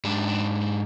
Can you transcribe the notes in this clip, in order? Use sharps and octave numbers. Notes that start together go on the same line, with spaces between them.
G#2 D4